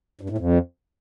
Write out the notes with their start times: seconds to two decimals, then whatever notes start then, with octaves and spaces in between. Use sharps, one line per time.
0.21 G2
0.30 A2
0.38 F2